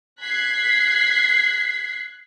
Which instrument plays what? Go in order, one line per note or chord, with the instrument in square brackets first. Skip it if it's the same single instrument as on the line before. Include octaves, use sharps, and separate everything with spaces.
[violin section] F#6 G#6 B6 C7